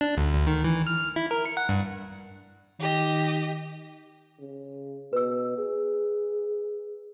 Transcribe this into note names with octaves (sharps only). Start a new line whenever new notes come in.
D4
D2
D2
D#3
E3
F6
E4
A#4
C#7
F#5
G2
D#3 G4 D#5
C#3
B2 B4 E6
G#4